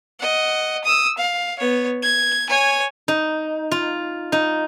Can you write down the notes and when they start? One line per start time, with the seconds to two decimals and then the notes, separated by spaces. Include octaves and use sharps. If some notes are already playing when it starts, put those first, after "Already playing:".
0.20 D#5 F#5
0.84 D#6 E6
1.17 F5
1.59 B3 C#5
2.02 G#6
2.49 C#5 G#5
3.08 D#4
3.72 F4
4.32 D#4